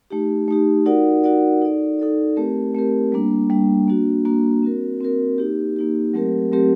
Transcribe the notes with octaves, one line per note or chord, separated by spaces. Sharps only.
A3 D#4 G4
A3 D#4 G4
D#4 F#4 A#4 D5 F#5
D#4 F#4 A#4 D5 F#5
D#4 A4 D5
D#4 A4 D5
A3 C4 G4 A#4
A3 C4 G4 A#4
G3 A#3 D4
G3 A#3 D4
A#3 D4 F#4
A#3 D4 F#4
C4 F#4 A#4
C4 F#4 A#4
A#3 D#4 G4
A#3 D#4 G4
F#3 A3 C4 G4 A#4
F#3 A3 C4 G4 A#4